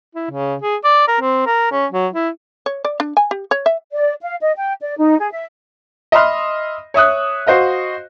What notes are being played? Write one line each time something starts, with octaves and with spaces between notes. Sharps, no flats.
E4
C#3
G#4
D5
A#4
C4
A#4
C#4
F#3
E4
C#5
D5
D4
G#5
G4
C#5
E5
D5
F5
D#5
G5
D5
D#4
G#4
E5
D#5 E5 B5 C6 F6
C#5 E5 D#6 F#6
F#4 C5 D#5 F5